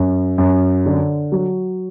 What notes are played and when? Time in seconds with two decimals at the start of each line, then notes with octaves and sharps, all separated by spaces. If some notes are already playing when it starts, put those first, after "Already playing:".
Already playing: F#2
0.38 F#2
0.86 D3
1.32 F#3